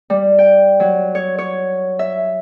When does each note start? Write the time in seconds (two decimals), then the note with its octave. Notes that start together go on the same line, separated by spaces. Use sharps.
0.10 G3
0.39 G5
0.80 F#3
1.15 C#5
1.38 C#5
1.99 E5